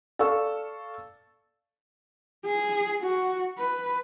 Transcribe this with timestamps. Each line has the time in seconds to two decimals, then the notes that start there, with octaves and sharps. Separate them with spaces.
0.19 A4 D5 F5 C#6 E6
2.46 G#4
3.01 F#4
3.58 B4